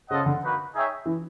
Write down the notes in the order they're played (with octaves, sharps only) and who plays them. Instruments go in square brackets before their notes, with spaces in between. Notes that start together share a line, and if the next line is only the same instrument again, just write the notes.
[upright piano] C#3 [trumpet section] F4 A4 C5 D#5 F#5
[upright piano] D3
[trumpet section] A#3 D#4 F#4 B4
D#4 G#4 C#5 E5 G5
[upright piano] E3